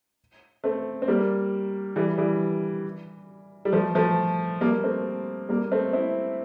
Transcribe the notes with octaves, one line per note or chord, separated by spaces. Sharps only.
A3 C4
C4
G3 A#3
E3 G3
E3 G3
G3
F3 A3
F3 A3
G3 A#3
A3 C4
G3 A#3
A3 C4
C4 E4